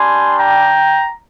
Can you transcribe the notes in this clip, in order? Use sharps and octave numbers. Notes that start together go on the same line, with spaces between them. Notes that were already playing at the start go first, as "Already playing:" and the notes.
Already playing: G3 D4 G4 G#5 C6
G5 A#5